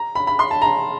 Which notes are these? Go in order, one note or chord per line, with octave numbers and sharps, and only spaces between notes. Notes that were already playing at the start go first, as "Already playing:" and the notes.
Already playing: A#5
B5
B5
C6
A5
A#5